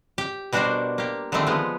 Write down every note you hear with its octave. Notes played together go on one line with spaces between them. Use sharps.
G4 G5
B2 G3 D4 F#4 A#4 C5
A#3 G4
D3 D#3 F3 G3 A3 C4
F3 G#3 B3